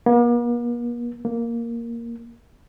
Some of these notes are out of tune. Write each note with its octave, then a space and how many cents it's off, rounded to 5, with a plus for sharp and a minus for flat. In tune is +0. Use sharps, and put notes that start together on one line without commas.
A#3 +45
A#3 +0